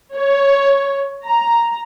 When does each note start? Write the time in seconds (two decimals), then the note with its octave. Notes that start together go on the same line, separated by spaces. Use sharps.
0.14 C#5
1.24 A#5